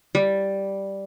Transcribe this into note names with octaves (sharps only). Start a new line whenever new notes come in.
G3